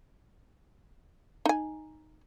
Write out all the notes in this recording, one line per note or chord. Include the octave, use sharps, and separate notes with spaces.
D#4 G#5